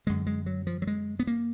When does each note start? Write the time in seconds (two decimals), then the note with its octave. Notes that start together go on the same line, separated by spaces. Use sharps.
0.07 F#2 D3 G#3
0.27 G#3
0.46 F#3
0.67 F3
0.82 F#3
0.87 G#3
1.19 B3
1.27 A#3